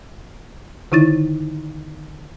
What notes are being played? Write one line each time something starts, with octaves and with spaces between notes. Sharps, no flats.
D3 D#3 D#4 E4 A6